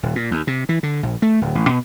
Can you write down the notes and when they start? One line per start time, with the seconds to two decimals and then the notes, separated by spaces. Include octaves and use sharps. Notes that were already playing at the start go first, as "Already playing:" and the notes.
0.03 D#1
0.16 A#2
0.31 D#2
0.47 C3
0.69 E3
0.83 D3
1.03 A#1
1.22 A3
1.41 D1
1.55 A1
1.69 B2